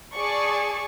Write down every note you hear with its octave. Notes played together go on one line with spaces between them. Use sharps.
G#4 D5 A5 C#6